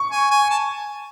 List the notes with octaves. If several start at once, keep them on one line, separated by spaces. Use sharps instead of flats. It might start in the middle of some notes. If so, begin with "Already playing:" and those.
Already playing: C#6
G#5
G#5
A5